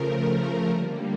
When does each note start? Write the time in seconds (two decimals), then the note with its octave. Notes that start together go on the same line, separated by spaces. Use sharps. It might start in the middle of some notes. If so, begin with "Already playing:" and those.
Already playing: C#3 F3 A3 A#4
0.70 D3 G3 A#3